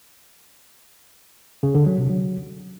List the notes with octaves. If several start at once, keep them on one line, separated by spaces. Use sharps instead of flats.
C#3
D3
F#3
C3
F#3